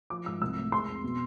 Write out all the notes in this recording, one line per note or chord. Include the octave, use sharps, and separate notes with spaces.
F3 D6
G#2 E6
C2 E6
A3
G#3 C6
F2
B2